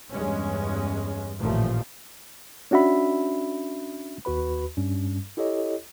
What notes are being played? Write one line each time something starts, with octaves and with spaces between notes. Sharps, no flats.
E2 G2 G#3 C#4
A1 D#2 A#2 F3 A3
C#4 D4 F#4 E5 B5
D#2 F#4 B4 B5
G2 G3 C#4
E4 G4 A4 C#5 D#5